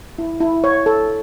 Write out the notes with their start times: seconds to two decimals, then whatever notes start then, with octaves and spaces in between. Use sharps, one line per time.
0.19 E4
0.40 E4
0.64 C#5
0.86 A4